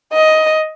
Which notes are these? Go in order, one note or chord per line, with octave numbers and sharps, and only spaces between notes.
D#5